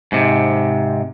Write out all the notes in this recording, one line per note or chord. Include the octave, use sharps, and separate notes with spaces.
G#2 C3